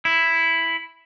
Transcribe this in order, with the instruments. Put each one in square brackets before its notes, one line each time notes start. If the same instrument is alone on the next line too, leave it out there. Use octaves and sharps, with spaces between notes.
[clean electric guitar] E4